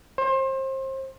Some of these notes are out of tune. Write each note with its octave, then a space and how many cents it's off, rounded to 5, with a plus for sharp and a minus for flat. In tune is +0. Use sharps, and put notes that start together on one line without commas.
C5 +30